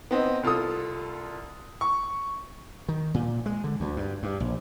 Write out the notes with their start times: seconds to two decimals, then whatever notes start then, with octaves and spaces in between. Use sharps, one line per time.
0.11 B3 C4 D#4
0.43 C2 F4 A4 D#6
1.81 C#6
2.89 D#3
3.14 A#2
3.46 G#3
3.64 D3
3.80 D2
3.97 G2
4.23 G2
4.40 A#1